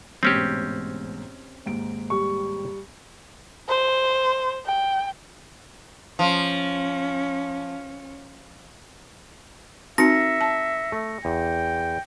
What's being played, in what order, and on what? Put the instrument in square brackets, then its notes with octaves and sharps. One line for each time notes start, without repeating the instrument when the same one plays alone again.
[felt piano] A1 G#2 B2 [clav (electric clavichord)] C4 C#4 G4
[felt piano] D#2 G#2 D7
[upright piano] G3 C#6
[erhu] C5
G5
[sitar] F3 [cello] C#4
[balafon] C4 D#4 F#4 [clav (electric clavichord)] A#4 [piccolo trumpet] E5 [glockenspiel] A#6 C#7
[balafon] A5
[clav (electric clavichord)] A3
[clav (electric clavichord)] E2 [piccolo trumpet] G5